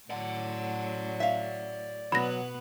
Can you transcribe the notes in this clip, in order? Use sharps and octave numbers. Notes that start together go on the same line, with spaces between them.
A2 F#3 D5 F#5
E5 F5
B2 F#3 B3 B4 B5 A#6